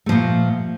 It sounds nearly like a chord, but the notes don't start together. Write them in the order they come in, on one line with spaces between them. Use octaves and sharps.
A3 F3 A#2